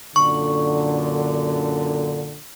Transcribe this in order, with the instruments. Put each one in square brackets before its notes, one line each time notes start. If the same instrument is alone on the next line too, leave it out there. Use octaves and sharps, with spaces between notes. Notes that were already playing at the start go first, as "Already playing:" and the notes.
[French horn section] F#2 A#2 D3 [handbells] C#6